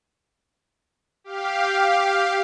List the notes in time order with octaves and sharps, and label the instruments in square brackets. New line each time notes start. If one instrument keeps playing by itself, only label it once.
[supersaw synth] G4 F5